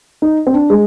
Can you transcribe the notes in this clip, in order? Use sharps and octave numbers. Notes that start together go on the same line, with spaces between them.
D#4
C4
D4
G#3